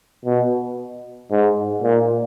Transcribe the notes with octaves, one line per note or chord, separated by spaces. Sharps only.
B2
G#2
A#2